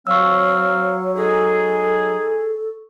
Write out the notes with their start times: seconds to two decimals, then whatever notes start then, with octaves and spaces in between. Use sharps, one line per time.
0.07 F#3 C4 C#5 F5 C#6 E6
1.16 G#3 D#4 G#4 A4